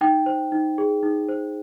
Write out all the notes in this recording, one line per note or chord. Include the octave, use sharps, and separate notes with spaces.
D#4 G5
C5
D#4
G#4
D#4
C5